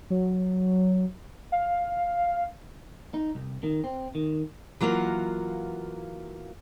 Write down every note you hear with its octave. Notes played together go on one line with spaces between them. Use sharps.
F#3
F5
D#4
C2
D#3
C4
D#3
E3 F#3 A#3 F4 F#5